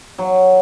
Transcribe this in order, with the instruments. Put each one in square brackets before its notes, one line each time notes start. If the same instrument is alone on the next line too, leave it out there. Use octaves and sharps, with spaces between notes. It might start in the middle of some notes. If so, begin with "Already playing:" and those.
[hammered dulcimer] F#3